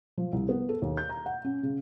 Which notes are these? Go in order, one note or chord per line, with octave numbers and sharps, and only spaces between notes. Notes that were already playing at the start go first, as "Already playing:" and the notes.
F3
C2
B3
A4
D#2
G6
A#5
F#5
C#4
C#3